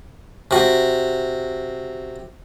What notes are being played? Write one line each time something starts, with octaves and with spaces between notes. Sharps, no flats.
C3 F#4